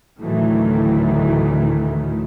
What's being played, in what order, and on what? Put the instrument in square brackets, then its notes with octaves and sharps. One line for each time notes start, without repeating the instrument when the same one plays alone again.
[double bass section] D2 A2 D#3 E3 F#3 A3